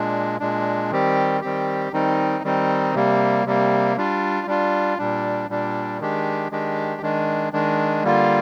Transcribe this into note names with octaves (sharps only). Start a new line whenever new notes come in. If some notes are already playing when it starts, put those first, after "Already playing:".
Already playing: A#2 G#3 D4
A#2 G#3 D4
D#3 G3 C4 G4
D#3 G3 C4 G4
D#3 G3 C4 D#4
D#3 G3 C4 D#4
C3 G3 A#3
C3 G3 A#3
G3 D4 F4
G3 D4 F4
A#2 G3 D4
A#2 G3 D4
D#3 G#3 D4 G4
D#3 G#3 D4 G4
D#3 G#3 D4
D#3 G#3 D4
D3 G3 A#3 F4